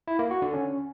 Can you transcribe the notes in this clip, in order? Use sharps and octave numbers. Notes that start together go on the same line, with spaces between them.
E4
A#3
F#4
D3
C#4